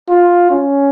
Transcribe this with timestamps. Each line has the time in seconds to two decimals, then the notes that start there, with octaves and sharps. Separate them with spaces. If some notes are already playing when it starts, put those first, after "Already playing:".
0.09 F4
0.50 C#4